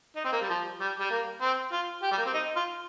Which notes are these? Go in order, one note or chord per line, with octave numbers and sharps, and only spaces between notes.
D#4
C4
A#3
G3
F3
G3
G3
A#3
C4
F4
G4
G3
A#3
C4
D#4
F4